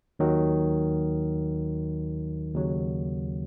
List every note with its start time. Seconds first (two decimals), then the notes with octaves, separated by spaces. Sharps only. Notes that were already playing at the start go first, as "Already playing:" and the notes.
0.19 D#2 D#3 F#3
2.54 D#2 C#3 F#3